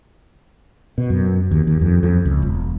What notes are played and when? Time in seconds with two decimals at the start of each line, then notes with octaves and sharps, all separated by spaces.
0.98 B2
1.10 F#2
1.51 D#2
1.67 D#2
1.81 F2
2.03 F2
2.26 C#2
2.42 E1